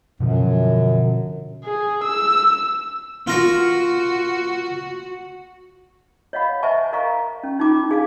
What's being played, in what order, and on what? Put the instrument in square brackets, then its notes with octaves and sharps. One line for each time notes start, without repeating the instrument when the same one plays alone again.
[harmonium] F#2 [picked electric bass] B2 D3 F3
[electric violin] G#4
E6
[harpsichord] F4 A#4 C#6 [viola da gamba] F#4
[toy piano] C#5 D#5 F5 F#5 B5
C5 D#5 E5 G#5 A5 C#6
A#4 D#5 F5 A#5 C#6
C#4
C#4 D#4 F4 D6
D4 G#4 F5 G#5 D6